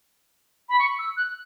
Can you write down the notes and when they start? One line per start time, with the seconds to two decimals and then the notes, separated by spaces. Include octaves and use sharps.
0.69 B5
0.79 C#6
0.98 E6
1.17 F#6